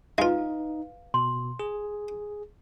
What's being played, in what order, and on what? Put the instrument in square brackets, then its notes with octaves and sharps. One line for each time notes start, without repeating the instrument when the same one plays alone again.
[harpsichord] G#3 F4 [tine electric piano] D#4 [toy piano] B4 F5
[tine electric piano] B2 [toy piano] C6
[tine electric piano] G#4